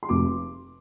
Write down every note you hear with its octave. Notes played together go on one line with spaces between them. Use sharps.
C6
F1 D6